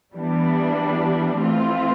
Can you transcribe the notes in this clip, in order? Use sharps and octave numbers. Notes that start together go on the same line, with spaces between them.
E3 G3 B3 D4
E3 A3 C4 F4